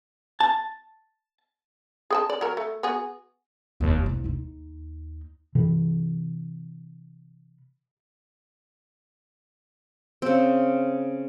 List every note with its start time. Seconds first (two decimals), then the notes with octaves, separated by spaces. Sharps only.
0.40 A5
2.10 G#4 G5 A5
2.30 D5
2.41 F#3 A#4
2.57 A3
2.83 B3 F#4 G#4
3.81 F1 D#2
4.04 C2 F2
4.24 D#2 D#4
5.55 C3 E3
10.22 C#3 C4